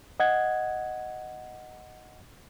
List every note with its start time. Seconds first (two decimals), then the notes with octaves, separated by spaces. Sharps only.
0.20 D#5 F#5 G#6